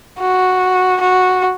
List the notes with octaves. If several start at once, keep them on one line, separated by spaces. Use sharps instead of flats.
F#4
F#4